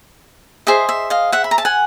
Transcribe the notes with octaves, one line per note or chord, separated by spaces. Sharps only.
G#4 C5 D#5 E5
E5
D#5 F5
E5 F#5
B5
A#5
A5
F#5 G#5